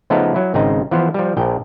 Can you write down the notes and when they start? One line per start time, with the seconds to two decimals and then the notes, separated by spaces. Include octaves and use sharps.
0.10 C#3 F3 A3 B3 D#4 A4
0.34 F#3 E4
0.54 G#1 C#3 C4 D#4
0.91 E3 F3 B3 C5
1.14 F3 G3
1.37 A#1 F3 G5